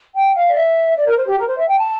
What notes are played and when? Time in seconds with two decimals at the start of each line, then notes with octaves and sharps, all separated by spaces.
0.14 G5
0.34 F5
0.48 D5
0.54 E5
0.96 D5
1.06 A#4
1.17 C5
1.27 G4
1.37 A#4
1.47 C5
1.58 E5
1.68 G5
1.78 A5